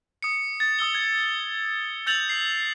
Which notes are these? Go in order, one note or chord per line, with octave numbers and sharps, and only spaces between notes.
D#6 C#7
A6
D#6 E6 G7
G#6
E6 G6 A6 F7 F#7
C7